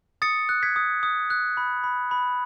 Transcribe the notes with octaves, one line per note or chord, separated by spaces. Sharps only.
D#6 A6 C#7
F#6
G#6 B6
D#6
D#6
F#6
B5
B5
B5